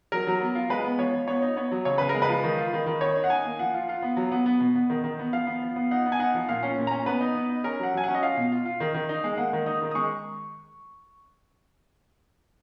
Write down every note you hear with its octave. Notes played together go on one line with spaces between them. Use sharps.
F#3 A#4
F#3
B3
F4
G#3 B4
B3
F3 C#5
F3
B3 C#5
D#4
B3 C#5
F#3
C#3 C#5
C#3 B4
A#4
G#3
B4
F3
D#3
F4
D#3
D#3
D#3 C#5
D#4
F#5
D#4 G#5
A#3
F3 F#5
F4
F4
B3
F#3
B3
B3
B2
B3
D#3
D#3
B3
F3 F5
B3
F3
B3
D#4 F#5
B3
G#5
D#4 F#5
F3
A#2 F5
C#4
A#2
C#4 A#5
B3 B4
D#4
B3
D#4
C#4 A#4
F#3 F#5
F#3 G#5
C#4 F#5
D#5
F4 F5
B2
F4
F4
D#3
D#3
D#4
G#3
A#3 F#5
D#3
D#4 D#6
D#3
D#6
G#3 C#6